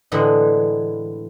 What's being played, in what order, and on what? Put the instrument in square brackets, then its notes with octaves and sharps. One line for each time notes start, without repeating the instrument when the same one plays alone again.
[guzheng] A2 D3 E3 G#3